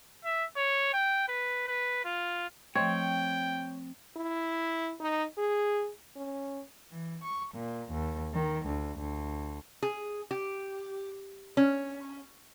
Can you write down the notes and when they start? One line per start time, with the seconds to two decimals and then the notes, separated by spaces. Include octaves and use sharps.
0.24 E5
0.57 C#5
0.93 G5
1.28 B4
1.68 B4
2.05 F4
2.76 F3 A3 C4 C#5 D#5 G5
4.17 E4
5.00 D#4
5.38 G#4
6.16 C#4
6.92 E3
7.23 C#6
7.54 A#2
7.91 D#2
8.34 D#3
8.66 D2
9.00 D2
9.83 G#4
10.31 G4
11.57 C#4